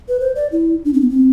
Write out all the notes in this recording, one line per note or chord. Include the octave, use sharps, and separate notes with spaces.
B4
C5
D5
E4
D4
C4
B3
C4